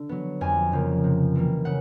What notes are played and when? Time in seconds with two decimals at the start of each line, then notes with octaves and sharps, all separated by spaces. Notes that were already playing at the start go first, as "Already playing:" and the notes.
Already playing: D3
0.09 F#3 B3
0.41 F2 G#5
0.72 C#3 F3 A#3
1.04 C3
1.35 E3 G3 A#3
1.65 C#3 F#5